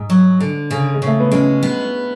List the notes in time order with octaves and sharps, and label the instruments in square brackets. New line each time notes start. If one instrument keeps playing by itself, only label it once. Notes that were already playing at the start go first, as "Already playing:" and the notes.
Already playing: [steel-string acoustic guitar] G#2
F#3
D3
C#3
[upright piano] G#3
[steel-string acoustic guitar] C#3
[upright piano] A3
B3
[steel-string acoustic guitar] G#3 [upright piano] C#4
[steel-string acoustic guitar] B3